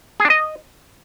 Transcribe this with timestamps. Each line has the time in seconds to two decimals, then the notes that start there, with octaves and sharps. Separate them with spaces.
0.20 G#4
0.25 D4
0.30 D#5